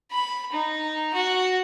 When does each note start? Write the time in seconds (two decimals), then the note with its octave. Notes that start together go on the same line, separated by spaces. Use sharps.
0.12 B5
0.52 D#4
1.14 F#4